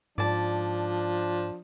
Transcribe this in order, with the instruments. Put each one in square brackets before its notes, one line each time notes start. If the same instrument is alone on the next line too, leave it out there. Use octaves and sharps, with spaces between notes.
[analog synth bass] G#2 [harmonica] F3 [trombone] D4 [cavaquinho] D5 A5